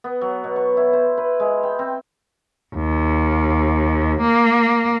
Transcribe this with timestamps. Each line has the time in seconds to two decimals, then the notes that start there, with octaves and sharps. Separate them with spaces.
0.04 B3
0.21 F#3
0.44 B2
0.56 C#6
0.77 E4
0.93 C5
1.18 B4
1.40 G#3
1.63 G5
1.79 C4
2.74 D#2
4.21 A#3